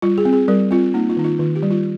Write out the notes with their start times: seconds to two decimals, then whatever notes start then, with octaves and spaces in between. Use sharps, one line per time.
0.02 G3 F4
0.18 G#4
0.25 C4
0.33 G#4
0.48 G3 A#4
0.71 C4 F4
0.94 A#3 D#4
1.09 F4
1.17 D#3 D#4
1.24 F4
1.39 D#3 F4
1.56 G4
1.63 G3
1.71 F4